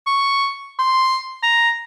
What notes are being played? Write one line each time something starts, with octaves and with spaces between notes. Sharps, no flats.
C#6
C6
A#5